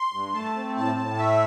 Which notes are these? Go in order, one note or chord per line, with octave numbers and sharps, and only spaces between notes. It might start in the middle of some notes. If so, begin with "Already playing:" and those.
Already playing: C6
G2
A3 A5
C4
A2 A5
A2
A3 E5